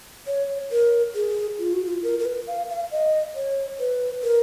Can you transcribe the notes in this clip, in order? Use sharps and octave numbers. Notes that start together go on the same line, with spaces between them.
C#5
A#4
G#4
F4
F#4
F4
A#4
A#4
B4
F5
F5
D#5
C#5
B4
A#4